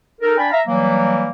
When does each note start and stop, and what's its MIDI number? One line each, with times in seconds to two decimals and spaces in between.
0.21 0.34 63
0.21 0.34 69
0.21 0.34 70
0.38 0.49 62
0.38 0.49 74
0.38 0.49 79
0.38 0.49 80
0.38 0.49 83
0.51 0.61 76
0.51 0.61 77
0.51 0.61 82
0.68 1.31 52
0.68 1.31 54
0.68 1.31 55
0.68 1.31 58